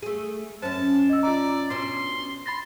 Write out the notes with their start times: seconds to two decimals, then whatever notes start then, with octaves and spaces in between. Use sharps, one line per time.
0.02 A3 G#4
0.62 F#2 C#4 C5 A5
1.10 D#5 E6
1.23 F4 D5 A#5
1.70 B2 C#4 D4 C6
2.46 B5 C6 A6 A#6